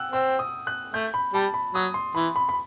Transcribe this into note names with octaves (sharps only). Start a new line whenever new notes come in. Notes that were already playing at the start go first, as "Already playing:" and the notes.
Already playing: F#5 G5 E6 F#6
C4 E6
D#6
F#6
A3 G6
B5
G3 A5
B5
F#3 D#6
C6
E3 B5
B5
B5